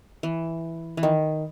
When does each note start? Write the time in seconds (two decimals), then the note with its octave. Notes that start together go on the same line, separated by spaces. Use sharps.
0.23 E3
0.97 E3
1.03 D#3